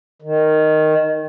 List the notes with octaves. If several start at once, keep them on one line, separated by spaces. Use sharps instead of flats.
D#3